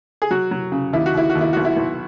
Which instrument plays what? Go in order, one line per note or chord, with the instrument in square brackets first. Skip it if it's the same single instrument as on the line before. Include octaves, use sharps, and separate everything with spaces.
[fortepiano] G#4
F#3 F#4
F#3
C#3
D#2 E4
F#4
D#2 E4
F#4
D#2
E4
B1 F#4
E4
B1